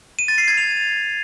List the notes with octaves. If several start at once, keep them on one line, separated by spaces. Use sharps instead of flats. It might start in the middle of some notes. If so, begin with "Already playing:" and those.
D#7
A6
C7
G#6
F7